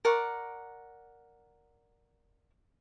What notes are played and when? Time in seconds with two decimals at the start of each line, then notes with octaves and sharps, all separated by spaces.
0.05 A#4 D5 F#5 C#6